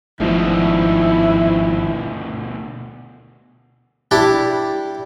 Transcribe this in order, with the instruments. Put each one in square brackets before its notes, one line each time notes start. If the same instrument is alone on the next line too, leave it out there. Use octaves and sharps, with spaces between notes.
[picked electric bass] G#1 G#2 F3 [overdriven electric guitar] D2 B2 [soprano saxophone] E4
[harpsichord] G3 D4 E4